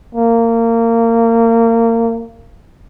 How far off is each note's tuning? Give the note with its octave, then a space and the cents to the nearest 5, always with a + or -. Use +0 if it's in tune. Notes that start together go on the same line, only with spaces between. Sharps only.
A#3 -25